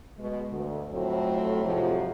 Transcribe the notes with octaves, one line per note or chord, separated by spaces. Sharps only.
B2 G#3
D2
F2 A2 F#3 A3 C4
F2 G#2 C3 F3 F#3